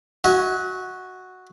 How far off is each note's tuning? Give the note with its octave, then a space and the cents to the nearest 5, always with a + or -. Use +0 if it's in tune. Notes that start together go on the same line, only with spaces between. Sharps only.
F#4 +0 E5 -45 G#5 +0